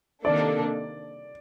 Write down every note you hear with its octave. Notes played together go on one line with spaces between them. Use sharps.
C3 D#3 A#3 D4 A4 D5